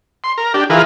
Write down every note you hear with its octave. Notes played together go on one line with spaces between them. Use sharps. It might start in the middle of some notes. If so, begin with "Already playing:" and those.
C6
A#4
D4 G4
E3 F4 G#4 A#4 B4